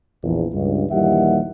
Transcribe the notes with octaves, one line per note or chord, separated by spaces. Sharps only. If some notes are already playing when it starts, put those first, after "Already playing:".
A#1 E2
C#2 G2
A#1 D#2 E3 G3 E5 F#5